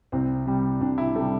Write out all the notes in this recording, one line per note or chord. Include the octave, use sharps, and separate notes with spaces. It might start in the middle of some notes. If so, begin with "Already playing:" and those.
C2 C4
C3 G3
C2 D4
E4
C3 G3 A4